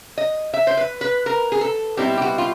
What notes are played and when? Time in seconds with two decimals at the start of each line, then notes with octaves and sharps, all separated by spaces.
0.18 D#5
0.54 E5
0.67 C5
0.77 B4
1.01 B4
1.26 A#4
1.52 G#4
1.61 A4
1.97 B2 G3 C4 E4 G4
2.17 G4
2.22 F#4
2.38 F4